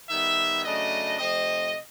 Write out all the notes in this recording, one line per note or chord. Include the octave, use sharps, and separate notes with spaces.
D#3 G3 B3 E5
C#3 F#3 A3 D4 D#5
C3 F3 A3 C4 D#5